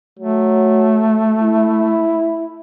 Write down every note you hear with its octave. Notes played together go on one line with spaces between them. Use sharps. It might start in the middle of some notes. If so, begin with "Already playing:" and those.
F#3 A3
E4